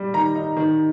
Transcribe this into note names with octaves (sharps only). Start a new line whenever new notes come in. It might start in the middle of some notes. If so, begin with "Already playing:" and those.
Already playing: G3
D#3 A#5
D#4
D#3